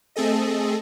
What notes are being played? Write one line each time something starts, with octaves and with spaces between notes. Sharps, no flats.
A3 C4 G#4 A4 D#5